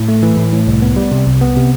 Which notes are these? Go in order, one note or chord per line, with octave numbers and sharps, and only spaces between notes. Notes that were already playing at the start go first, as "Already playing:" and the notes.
Already playing: A2
A3
E3
A2
A2
C2
B3
G3
C3
C2
B3
C3